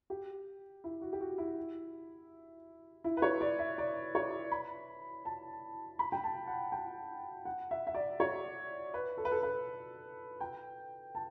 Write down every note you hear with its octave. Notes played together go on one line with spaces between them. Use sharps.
G4
E4
F#4
G4
F#4
E4
E4
B4
C#5
D5
E5
D5
C#5
B5
A5
B5
G5
A5
F#5
G5
F#5
E5
E5
D5
C#5
B4
A4
B4
A4
B4
G5
A5